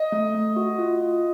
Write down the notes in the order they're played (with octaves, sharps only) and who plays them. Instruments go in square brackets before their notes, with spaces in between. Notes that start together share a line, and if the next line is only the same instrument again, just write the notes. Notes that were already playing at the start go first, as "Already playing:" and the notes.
Already playing: [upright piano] D#5
[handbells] A3
A3
F#4
F4
F4